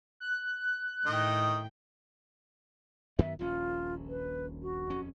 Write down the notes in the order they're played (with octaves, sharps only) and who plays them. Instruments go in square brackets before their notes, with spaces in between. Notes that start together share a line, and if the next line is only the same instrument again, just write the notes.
[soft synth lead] F#6
[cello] A2 G5 [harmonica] D#3 D#5
[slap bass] F#2 D#3 B3 [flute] E5
[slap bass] D#1 A#1 C#4 [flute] F4
[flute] B4
F#4
[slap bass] D#1 F2 C#4